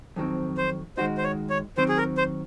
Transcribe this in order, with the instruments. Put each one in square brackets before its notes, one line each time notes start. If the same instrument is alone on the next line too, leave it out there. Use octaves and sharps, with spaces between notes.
[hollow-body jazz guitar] F2 D#3 F#3 C4
[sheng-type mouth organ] C5
[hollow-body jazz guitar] D#3 G#3 D#4 F#4 [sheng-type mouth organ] C5
[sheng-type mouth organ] C5
C#5
C#5
[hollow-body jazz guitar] D#3 F#3 C4 [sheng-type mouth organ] C5
[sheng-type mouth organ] G#4
A#4
C5